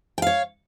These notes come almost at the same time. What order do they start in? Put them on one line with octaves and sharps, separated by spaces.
G5 F5 C#5